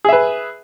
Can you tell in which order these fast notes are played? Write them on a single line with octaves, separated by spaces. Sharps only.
G#4 E5 B4